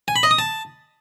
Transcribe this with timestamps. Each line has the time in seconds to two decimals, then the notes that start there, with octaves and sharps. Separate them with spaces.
0.08 G#5
0.16 B5
0.23 D#5
0.31 D#6
0.39 A5